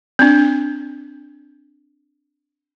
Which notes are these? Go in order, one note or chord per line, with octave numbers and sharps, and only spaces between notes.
C4 D4